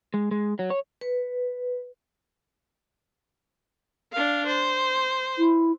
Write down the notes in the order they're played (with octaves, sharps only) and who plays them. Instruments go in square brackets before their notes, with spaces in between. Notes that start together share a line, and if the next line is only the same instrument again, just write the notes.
[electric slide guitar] G#3
G#3
F#3
C#5
[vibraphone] B4
[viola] D4 F5
C5
[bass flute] E4